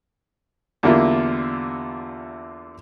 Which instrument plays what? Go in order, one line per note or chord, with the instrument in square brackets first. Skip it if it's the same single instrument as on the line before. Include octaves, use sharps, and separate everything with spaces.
[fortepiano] E2 D3 G3 A#3 E4 F4